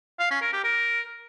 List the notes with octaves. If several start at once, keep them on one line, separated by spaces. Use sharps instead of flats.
F5
C#4
A#4
G4
A#4